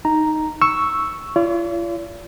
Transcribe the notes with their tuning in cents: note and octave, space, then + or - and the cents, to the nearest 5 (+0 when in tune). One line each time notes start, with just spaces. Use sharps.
D#4 +0 A#5 +0
C#6 +0 E6 +0
F4 -40 D5 -45